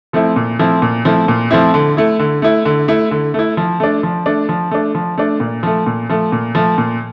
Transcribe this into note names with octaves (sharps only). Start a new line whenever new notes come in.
F3 A3 C4 E4
A#2
F3 A3 C4 E4
A#2
F3 A3 C4 E4
A#2
F3 A3 C4 E4
D3
A3 E4
D3
A3 E4
D3
A3 E4
D3
A3 E4
F3
A3 D4
F3
A3 D4
F3
A3 D4
F3
A3 D4
A#2
F3 A3
A#2
F3 A3
A#2
F3 A3
A#2